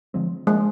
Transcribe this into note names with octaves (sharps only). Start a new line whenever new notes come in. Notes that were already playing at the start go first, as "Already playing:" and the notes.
D3 F3 G#3 C4
F3 G#3 A#3 D4